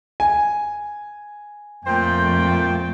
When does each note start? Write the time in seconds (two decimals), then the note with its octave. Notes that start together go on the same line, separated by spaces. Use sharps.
0.20 G#5
1.86 F2 A#2 A3 C5 G5